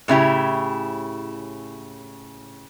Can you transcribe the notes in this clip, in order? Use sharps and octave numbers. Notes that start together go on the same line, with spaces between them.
A2 C#3 E4 G4